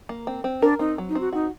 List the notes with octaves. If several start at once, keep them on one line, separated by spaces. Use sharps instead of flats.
A#3
C4
C4
D4 A#4
C4 D#4
F#3
D#4
C4
F#4
D#4 F#4